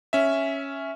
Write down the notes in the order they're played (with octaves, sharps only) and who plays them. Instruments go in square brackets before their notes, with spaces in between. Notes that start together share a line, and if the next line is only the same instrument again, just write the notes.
[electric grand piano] C#4 E5